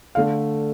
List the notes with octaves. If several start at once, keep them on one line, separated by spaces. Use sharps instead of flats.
D3 A3 F5